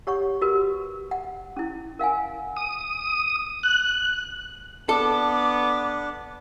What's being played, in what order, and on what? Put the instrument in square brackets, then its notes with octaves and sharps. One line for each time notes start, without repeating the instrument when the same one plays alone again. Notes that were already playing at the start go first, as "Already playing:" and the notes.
[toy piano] G4 C#5 F#5 C#6
F#4 G4 A#4 B4
F#5
C#4 E4
A#4 F5 F#5 G#5
[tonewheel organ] D#6
F#6
[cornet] B3 [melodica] D4 [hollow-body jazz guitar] A4 [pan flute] D6